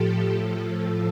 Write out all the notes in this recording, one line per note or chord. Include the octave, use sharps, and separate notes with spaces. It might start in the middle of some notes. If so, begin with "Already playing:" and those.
Already playing: A2 F3 G4 A4
A2 F3 A4